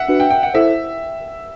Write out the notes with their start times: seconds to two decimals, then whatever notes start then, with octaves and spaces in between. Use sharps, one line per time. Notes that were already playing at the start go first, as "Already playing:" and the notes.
Already playing: E5 F#5
0.08 D4 F#4 B4
0.20 G5
0.30 G5
0.43 F#5
0.54 E4 A4 C5 E5